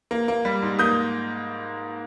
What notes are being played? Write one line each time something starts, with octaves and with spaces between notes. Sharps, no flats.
A#3
A#3
G3
G#2
A#3 D#6 G6